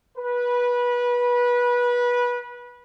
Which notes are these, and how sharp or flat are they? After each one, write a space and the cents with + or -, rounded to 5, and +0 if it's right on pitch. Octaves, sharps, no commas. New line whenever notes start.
B4 -20